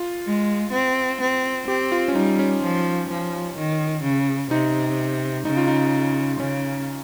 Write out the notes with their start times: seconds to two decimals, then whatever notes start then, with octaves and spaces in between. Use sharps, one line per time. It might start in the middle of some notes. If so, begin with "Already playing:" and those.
Already playing: F4
0.27 G#3
0.73 C4
1.21 C4
1.68 C4 G4
1.92 F4
2.08 C#4
2.15 G3 D#4
2.39 C#4
2.63 F3
3.09 F3
3.57 D#3
4.03 C#3
4.51 C3 D#4
5.45 C#3 D#4
5.57 F4
5.68 D#4
6.39 C#3 C#4